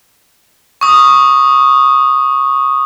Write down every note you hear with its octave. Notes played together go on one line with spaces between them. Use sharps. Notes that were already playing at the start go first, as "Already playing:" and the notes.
C#6 D#6